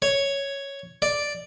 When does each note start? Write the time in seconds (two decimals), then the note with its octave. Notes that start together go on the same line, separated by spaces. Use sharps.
0.02 C#5
1.02 D5